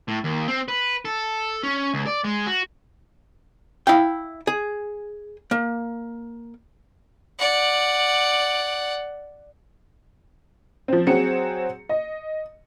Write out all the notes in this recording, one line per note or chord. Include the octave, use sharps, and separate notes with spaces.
A2
D#2
C4
B4
A4
C#4
C#2
D5
G#3
F#4
E4 F5 G5
G#4
A#3
D5 F#5
F3 C4
F#3 C4 F#4 G#4 C#7
D#5